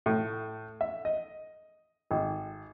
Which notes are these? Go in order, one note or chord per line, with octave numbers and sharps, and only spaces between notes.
A2
E5
D#5
G#1